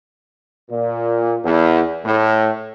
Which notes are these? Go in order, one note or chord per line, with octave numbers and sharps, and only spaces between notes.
A#2
E2
A2